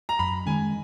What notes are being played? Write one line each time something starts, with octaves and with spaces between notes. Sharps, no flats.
A#5
F#2 B5
D#3 G#3 C#4 G#5